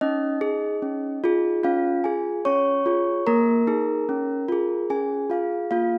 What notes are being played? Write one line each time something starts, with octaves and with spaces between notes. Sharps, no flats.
C#4 D#4 D#5
G#4
C#4
F4 G#4
C#4 F4 F5
F4 G#4 G#5
C#4 C#5 C#6
F4 G#4
A#3 A#4 A#5
D#4 G#4
C#4
F4 G#4
C#4 G#4 G#5
F4 G#4 F5
A#3 F4 F5